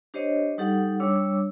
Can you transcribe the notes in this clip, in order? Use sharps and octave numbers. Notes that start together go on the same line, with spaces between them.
D4 G4 C5 C#5 D#5
G3 D#4 G4 A4 F#5
G3 D4 C#5 D6 E6